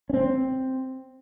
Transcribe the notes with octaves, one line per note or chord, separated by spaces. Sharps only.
C4 C#4